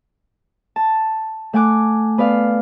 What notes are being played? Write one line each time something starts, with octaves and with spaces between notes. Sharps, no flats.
A5
A3 F#5 G#5 D6 F#6
B3 B4 D5 F5